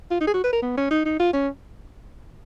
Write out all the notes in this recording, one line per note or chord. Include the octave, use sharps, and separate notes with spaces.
F4
D#4
G#4
F#4
B4
A#4
B3
C#4
D#4
D#4
F4
C#4